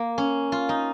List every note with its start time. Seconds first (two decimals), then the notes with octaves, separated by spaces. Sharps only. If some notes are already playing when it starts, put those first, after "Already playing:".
Already playing: A#3
0.18 C#4
0.52 F4
0.69 D#4